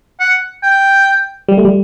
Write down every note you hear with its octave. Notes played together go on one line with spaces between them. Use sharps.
F#5
G5
G3
A3
G3